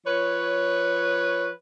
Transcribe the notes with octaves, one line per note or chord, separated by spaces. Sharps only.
F3 B4 C#5